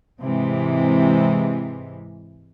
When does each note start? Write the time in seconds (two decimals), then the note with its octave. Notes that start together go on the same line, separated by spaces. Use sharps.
0.19 G#2 C3 E3 G#3